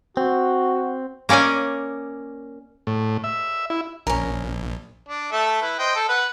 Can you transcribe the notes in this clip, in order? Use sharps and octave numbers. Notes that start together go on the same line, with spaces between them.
C4 F#4
A#3 C#4 D5 D#5 G#5
A2
E5
E4
A#1 C#4 A#4
D4
A3 A4 E5
E4 B4
C5 D#5 G5
A4
B4 F#5